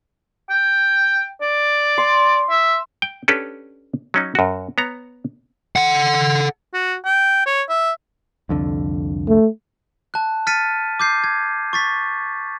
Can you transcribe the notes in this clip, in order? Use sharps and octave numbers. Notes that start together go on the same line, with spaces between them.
G5
D5
C6
E5
G5
C#4 D4 G4 A4 B4
F#3 C#4 D#4
F#2 F#4
B3 C#5 A#5
A4 F#5
F#4
G5
C#5
E5
C2 F2 D3
A3
A5 F#6
F6 A6 B6 C#7 D#7
D6 G6 C7
G#6
C#6 A6 B6